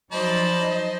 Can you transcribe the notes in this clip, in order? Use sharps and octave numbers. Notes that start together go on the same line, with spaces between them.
F3 F#3 D#4 C5 D5 D#5 A5 B5